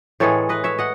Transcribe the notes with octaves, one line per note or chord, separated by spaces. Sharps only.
A2 E3 G#3 A4 C#5
B4 D#5
C#5 E5
D#5 F#5